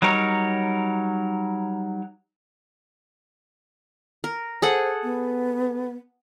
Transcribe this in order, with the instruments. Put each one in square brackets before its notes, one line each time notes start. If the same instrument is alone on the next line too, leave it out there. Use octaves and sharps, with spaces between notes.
[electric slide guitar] F#3 G3 D#4 A#4 C#5
[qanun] A#4
[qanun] G#4 A4 F#5 [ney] C5
[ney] B3